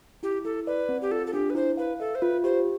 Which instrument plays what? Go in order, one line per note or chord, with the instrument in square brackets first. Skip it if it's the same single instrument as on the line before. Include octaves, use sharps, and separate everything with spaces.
[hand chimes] E4 [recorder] G4
[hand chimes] E4 [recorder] A4
[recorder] B4 [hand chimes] D5
[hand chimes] C4
[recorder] G4
[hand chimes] F4 [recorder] A4
[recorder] A4
[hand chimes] D4 [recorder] G4
[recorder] B4
[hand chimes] E4 [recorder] C5
[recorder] B4 [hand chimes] F5
[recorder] A4 [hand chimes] E5
[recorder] C5
[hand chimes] F4 [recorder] B4
[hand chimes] G4 [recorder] C5